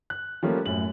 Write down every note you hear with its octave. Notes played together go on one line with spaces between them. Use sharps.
F#6
F3 G3 A3 A#3 C#4
F#2 A2 F#7